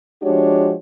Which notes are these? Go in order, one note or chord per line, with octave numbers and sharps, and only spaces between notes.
F3 G#3 D4 F#4 G4 C#5